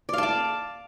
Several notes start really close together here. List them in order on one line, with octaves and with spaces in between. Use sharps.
D5 F5 A5 D6